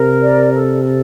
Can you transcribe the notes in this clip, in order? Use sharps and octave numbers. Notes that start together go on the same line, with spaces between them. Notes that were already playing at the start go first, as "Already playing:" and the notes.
Already playing: C3 A#4
D5
A4
A4